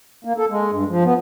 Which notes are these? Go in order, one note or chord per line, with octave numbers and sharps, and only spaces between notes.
A#3
A4
G#3
G2
F3
B3